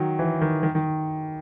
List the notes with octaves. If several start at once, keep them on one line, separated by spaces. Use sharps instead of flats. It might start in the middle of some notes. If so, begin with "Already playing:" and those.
Already playing: D#3 F#3
E3
D#3
D#3
D#3